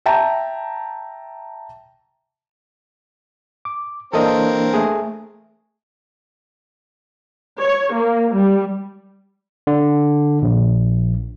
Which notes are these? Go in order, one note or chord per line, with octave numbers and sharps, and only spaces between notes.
E5 G5 A5 A#5
D6
E3 A#3 C4 D4 A4 A#4 D#5
A3 G#4
C#5
A#3
G3
D3
A#1